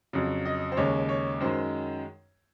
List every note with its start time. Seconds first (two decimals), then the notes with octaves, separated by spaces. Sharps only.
0.13 F2 C#3 F#3
0.45 D#5
0.72 C5
0.77 D#2 C#3 G#3 C#5
1.09 C#5
1.40 F#2 D#3 G#3 C5